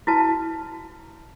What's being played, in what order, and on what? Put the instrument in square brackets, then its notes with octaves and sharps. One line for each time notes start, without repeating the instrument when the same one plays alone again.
[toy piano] E4 F#4 B4 A5